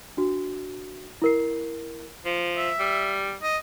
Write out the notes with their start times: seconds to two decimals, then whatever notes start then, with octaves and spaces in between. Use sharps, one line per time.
0.17 D4 F#4
1.22 E4 A#4 C7
2.25 F3
2.57 E5
2.79 G3
3.42 D#5